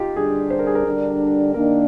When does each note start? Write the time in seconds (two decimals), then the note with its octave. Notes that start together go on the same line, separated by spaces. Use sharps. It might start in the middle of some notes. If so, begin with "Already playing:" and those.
Already playing: D#4 F4 G4
0.16 D3 G3 D4 G#4
0.50 C5
0.59 A#4
0.67 G#4
0.75 A#4
0.85 D3 G3 D4
1.54 D#3 A#3 D4 A#4